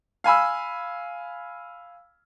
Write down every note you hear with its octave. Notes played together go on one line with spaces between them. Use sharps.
F5 G#5 B5 E6